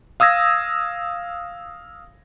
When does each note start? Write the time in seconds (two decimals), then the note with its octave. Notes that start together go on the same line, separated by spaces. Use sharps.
0.20 F5 D#6 E6 G#6 A#6